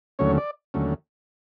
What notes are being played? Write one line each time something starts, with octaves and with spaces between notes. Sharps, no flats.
D#2 D3 F#3 A3 C#4 C#5
D5
D#2 D3 F#3 A3 C#4